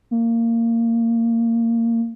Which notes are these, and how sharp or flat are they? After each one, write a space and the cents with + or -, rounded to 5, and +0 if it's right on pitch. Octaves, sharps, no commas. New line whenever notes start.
A#3 -20